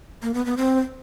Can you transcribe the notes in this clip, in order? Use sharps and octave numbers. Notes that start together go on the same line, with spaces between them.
A#3
B3
B3
C4